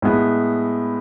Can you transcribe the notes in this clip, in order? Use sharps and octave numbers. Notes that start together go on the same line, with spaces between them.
A2 G#3 B3